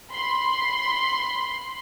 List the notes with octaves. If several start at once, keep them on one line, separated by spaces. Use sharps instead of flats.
B5 C6